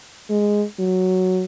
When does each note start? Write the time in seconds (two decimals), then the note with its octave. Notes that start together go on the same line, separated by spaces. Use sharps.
0.30 G#3
0.79 F#3